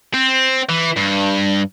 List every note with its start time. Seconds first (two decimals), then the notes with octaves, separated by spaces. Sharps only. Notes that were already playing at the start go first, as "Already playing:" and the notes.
0.14 C4
0.69 E3
0.96 G2